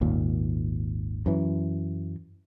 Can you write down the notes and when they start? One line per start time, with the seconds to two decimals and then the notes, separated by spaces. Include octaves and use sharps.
0.01 G#1 D#2 A#2
1.26 F#2 E3